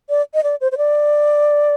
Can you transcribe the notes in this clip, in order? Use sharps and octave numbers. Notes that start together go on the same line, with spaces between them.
D5
D#5
D5
C5
C5
D5